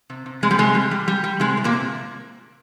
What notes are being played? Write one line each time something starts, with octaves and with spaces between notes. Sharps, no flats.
C3
C3
C3 G#3
G3
C3 G#3
G3
G3
G3
G3
C3 G#3
C3
A#2 A#3
C3